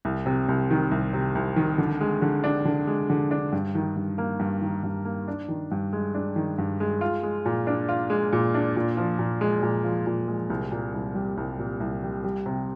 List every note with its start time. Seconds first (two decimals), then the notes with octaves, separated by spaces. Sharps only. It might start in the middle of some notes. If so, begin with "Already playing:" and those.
0.05 C2
0.26 C3
0.48 C2
0.70 D#3
0.91 C2
1.13 C3
1.35 C2
1.56 D#3
1.78 D3
2.01 G#3
2.22 D3
2.44 D4
2.65 D3
2.87 G#3
3.10 D3
3.31 D4
3.52 G2
3.75 D#3
3.96 G2
4.18 A#3
4.40 G2
4.61 D#3
4.83 G2
5.05 A#3
5.28 D4
5.48 D#3
5.71 G2
5.93 G#3
6.15 D4
6.36 D#3
6.58 G2
6.80 G#3
7.01 F4
7.23 G#3
7.45 A#2
7.67 D4
7.89 F4
8.10 G#3
8.32 A#2
8.54 D4
8.76 A#2
8.97 F3
9.19 A#2
9.41 G#3
9.63 A#2
9.84 F3
10.06 A#2
10.28 G#3
10.50 C2
10.71 A#2
10.94 C2
11.15 G3
11.37 C2
11.59 A#2
11.80 C2
12.03 G3
12.24 G3
12.46 C3